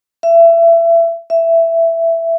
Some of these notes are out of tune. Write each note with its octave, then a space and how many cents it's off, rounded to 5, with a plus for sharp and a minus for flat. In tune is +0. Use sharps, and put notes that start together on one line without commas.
E5 +25
E5 +10